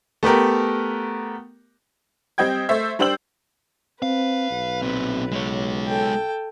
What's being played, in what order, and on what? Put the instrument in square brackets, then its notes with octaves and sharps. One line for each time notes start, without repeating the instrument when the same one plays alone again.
[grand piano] A3 B3 G4 A#4
[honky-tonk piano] G3 C4 D#5 G5 G#6
A3 C5 E5
G3 D4 C5 G5 E6 F#7
[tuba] C4 [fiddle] B4 [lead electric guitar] F5
[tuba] B1
[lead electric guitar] A#2 C4
G#3 C#5
[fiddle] A4 G5